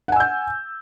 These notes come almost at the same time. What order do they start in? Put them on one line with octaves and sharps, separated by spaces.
F#5 G#5 E6 G6